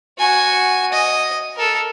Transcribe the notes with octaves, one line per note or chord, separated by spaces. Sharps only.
F#4 G#5
D#5
A4 A#4